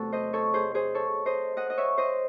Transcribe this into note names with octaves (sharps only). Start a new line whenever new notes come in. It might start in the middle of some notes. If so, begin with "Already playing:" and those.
Already playing: E2 C3 F#3 A3 C4 A4
C5 D#5
A4 C#5
G#4 C5
G#4 C5
A4 C#5
C5 D#5
D#5 F#5
D#5
C#5 E5
C5 D#5